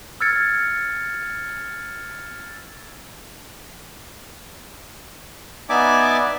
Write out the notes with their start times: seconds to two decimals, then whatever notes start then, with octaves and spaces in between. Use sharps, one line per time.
0.20 E6 F6 G#6 A6 C#7
5.70 B3 D#4 D5 E5 G#5 D6